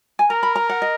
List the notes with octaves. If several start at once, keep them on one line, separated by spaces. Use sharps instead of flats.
G#5
A#4 A#5
B5
A#5
F#5
D#5